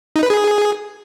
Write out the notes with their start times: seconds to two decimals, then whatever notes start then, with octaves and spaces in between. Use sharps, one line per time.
0.16 D#4
0.23 B4
0.30 G#4